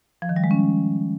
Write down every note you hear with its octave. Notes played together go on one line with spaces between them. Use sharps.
F3
D#3
G3
G#3
C#4